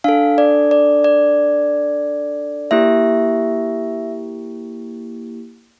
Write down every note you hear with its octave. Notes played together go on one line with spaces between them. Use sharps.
D4 A4 F5
D5
D5
D5
A#3 E4 G4 E5